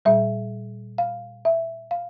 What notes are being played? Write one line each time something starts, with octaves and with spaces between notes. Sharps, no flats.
A#2 G3 E5
F5
E5
F5